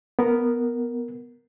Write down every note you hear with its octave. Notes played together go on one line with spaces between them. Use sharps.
B3 A#4